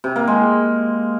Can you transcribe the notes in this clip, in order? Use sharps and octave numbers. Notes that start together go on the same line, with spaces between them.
C3
A#3
G#3